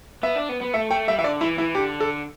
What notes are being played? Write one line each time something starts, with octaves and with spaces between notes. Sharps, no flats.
B3 E5
D4
B3
B3
A3 E5
A3 G5
G3 E5
E3 E5
D3 D5
E3 E4
E3 E4
D3 G4
A4